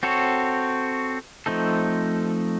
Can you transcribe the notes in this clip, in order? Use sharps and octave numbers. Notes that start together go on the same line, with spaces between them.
C4 F#4 A4 C#5
F3 A3 C4 D#4 A4